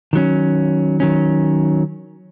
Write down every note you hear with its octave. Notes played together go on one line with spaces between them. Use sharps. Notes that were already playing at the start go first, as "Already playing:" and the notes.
D#3 F#3 C#4
D#3 F#3 C#4